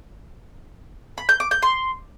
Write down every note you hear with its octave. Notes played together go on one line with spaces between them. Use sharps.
B5
G6
D6
G6
C6